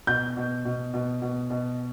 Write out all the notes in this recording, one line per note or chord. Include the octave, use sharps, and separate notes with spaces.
B2 G6
B2
B2
B2
B2
B2